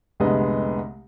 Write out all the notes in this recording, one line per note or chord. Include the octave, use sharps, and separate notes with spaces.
F1 C2 D3 G#3 B3 D#5